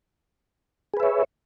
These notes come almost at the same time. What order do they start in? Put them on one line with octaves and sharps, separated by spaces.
G#4 B4 E5 C#5